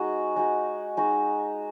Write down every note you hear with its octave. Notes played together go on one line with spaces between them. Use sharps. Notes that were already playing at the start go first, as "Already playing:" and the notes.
Already playing: G#3 D#4 F#4
G#3 D#4 F#4
G#3 D#4 F#4